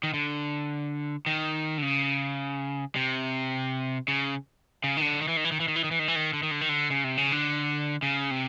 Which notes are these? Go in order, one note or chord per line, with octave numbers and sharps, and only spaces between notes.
D#3
D3
D#3
D3
C#3
C3
C#3
C#3
D#3
D3
D#3
E3
D#3
E3
D#3
E3
D#3
E3
D#3
E3
D#3
E3
D#3
D3
D#3
D3
D#3
D3
C#3
C3
C#3
D3
C#3
C3